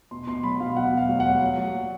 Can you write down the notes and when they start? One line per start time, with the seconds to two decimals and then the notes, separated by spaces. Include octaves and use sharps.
0.11 B2 C6
0.27 B2 C6
0.44 F#3 B5
0.60 B2 F5
0.76 F#3 F#5
0.93 B2 F5
1.09 F#3
1.20 F#5
1.25 F#3
1.41 F#3
1.57 F#3
1.74 A#2